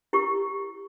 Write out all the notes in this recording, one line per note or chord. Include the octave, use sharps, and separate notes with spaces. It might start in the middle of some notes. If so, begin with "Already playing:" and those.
E4 G4 A#4 C#6